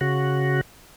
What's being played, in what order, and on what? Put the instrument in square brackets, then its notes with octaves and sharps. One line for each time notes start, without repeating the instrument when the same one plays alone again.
[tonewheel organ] C#3 F#4